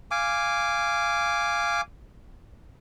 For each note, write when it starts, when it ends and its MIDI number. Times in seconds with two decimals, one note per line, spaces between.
0.11 1.81 77
0.11 1.81 80
0.11 1.81 86